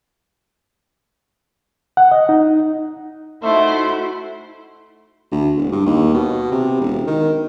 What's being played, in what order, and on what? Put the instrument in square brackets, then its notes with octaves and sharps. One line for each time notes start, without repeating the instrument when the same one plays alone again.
[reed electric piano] F#5
D#5
D#4
[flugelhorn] A3 [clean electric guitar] D#4 E5 [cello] E4 F#4 [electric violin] C5
[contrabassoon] D2
E1
G2
D#2
B2
C3
E1
D#3